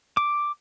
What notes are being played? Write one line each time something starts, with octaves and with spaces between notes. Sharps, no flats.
D6